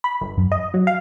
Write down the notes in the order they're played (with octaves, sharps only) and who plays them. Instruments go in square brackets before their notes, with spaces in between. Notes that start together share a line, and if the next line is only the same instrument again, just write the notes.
[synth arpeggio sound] B5
G1
F#2
D#5
F#3
F5